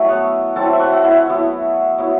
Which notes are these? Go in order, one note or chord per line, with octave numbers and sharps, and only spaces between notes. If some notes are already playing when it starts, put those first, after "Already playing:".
Already playing: F#3 A3 E4 A4
B3 B4
F#3 C4 E4 A4 A5
E5
F#4 F#5
F#5
E4 E5
F#3 B3 E4
F#3 B3 E4